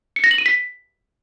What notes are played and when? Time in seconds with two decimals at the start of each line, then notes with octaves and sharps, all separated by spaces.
0.16 C#7
0.24 A#6
0.31 F#7
0.38 D#7
0.46 B6